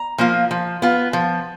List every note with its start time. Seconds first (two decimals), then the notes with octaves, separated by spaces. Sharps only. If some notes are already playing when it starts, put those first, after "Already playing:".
Already playing: A#5
0.18 F3 A#3 F4
0.51 F3
0.82 B3 F4
1.13 F3